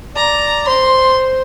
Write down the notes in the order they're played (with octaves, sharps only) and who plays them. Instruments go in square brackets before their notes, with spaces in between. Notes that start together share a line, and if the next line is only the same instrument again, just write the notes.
[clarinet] D5 [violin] A#5
[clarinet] C5 [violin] C6